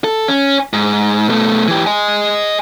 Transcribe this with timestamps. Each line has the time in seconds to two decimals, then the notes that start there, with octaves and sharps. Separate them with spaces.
0.04 A4
0.28 C#4
0.73 G#2
1.29 B2 A3
1.68 E3 G4
1.87 D#5 G#5